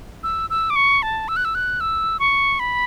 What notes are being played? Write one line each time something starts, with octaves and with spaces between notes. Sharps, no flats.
E6
E6
D6
C#6
A5
E6
F#6
E6
F#6
E6
C#6
B5